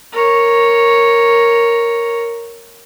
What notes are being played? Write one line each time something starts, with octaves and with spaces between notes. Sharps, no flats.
A#4 C#5